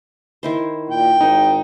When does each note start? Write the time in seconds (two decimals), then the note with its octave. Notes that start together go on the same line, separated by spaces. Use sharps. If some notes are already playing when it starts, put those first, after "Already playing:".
0.43 D#3 E4 C5
0.90 A#2 G5
1.21 G#1 D#4